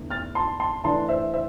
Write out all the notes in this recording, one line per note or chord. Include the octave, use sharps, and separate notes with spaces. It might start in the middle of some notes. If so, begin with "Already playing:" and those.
Already playing: E2 D3 A3
F6 A6
A5 C6
A5 C6
E3 A3 D4 A5 C6
C5 E5
C5 E5